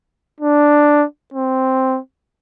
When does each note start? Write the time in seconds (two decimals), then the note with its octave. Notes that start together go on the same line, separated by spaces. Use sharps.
0.40 D4
1.34 C4